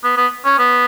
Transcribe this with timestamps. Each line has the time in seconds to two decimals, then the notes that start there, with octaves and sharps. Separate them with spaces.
0.04 B3
0.17 B3
0.45 C#4
0.58 B3